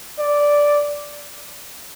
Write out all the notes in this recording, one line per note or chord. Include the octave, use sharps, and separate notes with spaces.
D5